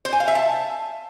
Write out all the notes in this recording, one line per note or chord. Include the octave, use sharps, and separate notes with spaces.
C5
G#5
F5
E5
A5